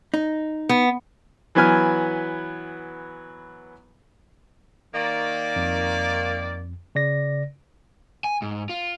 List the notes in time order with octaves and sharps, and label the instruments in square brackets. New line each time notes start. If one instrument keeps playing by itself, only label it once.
[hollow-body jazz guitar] D#4
[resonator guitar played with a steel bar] B3
[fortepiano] E3 F#3 B3 B4 G#5 F6
[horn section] D#3 A#3 D5
[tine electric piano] F2
C#3 D5 A#6
[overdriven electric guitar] G#5
G#2
F4